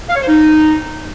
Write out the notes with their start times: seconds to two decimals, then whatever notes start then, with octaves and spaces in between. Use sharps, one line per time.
0.09 F5
0.15 C#5
0.21 C5
0.27 D#4